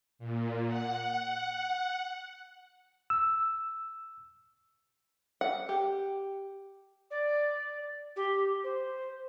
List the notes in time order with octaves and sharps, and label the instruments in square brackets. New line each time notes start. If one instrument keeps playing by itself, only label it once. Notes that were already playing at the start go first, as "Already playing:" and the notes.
[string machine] A#2
F#5
[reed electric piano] E6
[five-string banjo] F#5
G4
[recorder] D5
G4
C5